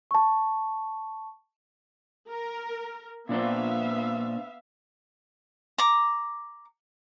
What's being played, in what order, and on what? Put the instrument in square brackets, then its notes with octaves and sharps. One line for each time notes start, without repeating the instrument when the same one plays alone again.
[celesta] A5 C#6
[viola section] A#4
[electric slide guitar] A#2 D4 C5 [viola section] B3 E5 F5
[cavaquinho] A#5 D6